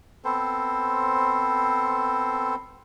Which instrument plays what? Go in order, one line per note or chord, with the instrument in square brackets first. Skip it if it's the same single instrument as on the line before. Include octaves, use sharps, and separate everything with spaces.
[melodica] B3 C4 A4 C5